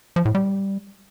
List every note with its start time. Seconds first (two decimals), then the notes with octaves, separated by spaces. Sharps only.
0.16 F3
0.25 A2
0.35 G3